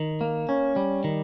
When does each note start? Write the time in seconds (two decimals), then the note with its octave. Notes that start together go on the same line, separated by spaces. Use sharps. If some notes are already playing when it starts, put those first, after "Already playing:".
Already playing: D#3
0.21 A#3
0.49 C#4
0.76 G3
1.04 D#3